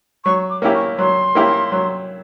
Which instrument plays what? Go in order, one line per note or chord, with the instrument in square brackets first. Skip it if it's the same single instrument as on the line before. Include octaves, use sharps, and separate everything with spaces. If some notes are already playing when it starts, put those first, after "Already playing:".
[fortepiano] F#3 [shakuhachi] C#6
[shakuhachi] D6
[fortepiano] A#3 C#4 E4 G4
[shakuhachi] C#6
[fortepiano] F#3 [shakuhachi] C6
[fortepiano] A#3 C#4 E4 G4
F#3